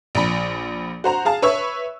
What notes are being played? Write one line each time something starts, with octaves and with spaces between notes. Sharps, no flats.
A#1 B5
F#4 C5 A#5
G#4 F5 A5
B4 C#5 E5 C#6 E6